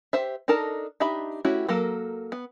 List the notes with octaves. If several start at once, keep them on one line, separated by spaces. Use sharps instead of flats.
G4 C5 E5
D4 D#4 A4 A#4 A5
D4 D#4 G4 E5 B5
A3 C#4 E4 F#4 G4
F#3 A#3 A4 A#4
B3